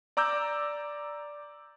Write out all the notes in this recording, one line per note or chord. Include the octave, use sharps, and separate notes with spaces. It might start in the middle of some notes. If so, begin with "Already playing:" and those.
D5 A#5 D6 E6 G6